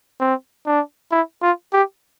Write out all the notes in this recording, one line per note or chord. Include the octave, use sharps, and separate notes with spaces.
C4
D4
E4
F4
G4